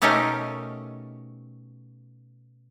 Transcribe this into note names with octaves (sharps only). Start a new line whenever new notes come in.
B2 A3 C#4 D#4 G4 A#4